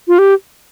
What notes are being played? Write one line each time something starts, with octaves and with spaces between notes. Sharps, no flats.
F4
G4